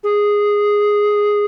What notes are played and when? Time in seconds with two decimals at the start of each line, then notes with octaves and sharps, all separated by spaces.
0.03 G#4